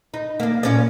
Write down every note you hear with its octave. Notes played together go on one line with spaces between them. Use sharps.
D#4
A#3 D4
A#2 C#4 D5